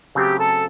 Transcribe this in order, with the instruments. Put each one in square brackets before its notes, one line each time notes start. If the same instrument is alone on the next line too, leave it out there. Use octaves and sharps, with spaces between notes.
[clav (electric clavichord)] C#3 F#3 A3 C4 [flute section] G4
[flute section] A4